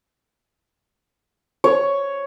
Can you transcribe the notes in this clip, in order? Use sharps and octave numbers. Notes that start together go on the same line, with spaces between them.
C#5